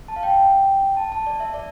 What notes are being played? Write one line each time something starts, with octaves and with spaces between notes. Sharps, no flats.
A5
F5
G5
A5
A5
D5
E5
D5